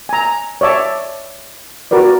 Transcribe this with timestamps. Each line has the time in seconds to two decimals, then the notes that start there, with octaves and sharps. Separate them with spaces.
0.09 G#5 A#5
0.61 C#5 D5 E5 A5
1.91 F#4 A#4 B4 D5